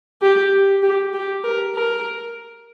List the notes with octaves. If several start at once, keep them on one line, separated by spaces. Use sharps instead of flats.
G4
G4
G4
A#4
A#4